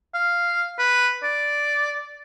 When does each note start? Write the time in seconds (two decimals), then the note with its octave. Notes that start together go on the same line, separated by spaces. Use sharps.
0.14 F5
0.79 B4
1.23 D5